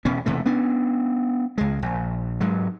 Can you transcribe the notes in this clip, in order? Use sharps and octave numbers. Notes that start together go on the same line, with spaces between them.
E1 B2 B3 C#4
E1 C3 E3 A3
B3 C#4 D4
C#2 G#3
A#1
G#2 F#3 G#3